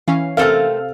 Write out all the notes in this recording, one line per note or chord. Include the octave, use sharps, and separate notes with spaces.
E3 C#4 F5
C3 A3 C4 A4 A#4 F5 A5 F6